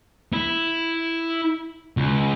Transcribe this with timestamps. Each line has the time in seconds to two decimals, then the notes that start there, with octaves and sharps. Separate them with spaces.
0.33 E4
1.97 C#2